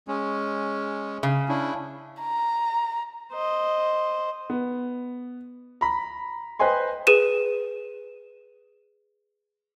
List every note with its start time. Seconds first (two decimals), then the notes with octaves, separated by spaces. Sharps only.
0.08 G#3 C#4
1.23 C#3
1.48 C#4 D4 E4
2.22 A#5
3.33 C5 D#5
4.50 B3
5.81 A#5 B5
6.59 B4 C5 D#5 G5 G#5 C6
7.07 G#4 B4 D#7 E7